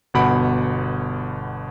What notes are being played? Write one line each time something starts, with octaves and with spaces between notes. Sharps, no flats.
G1 B2 F#5 B5 D7